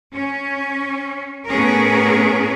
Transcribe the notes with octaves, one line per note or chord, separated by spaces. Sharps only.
C#4
A2 B3 C#4 G#4 A#4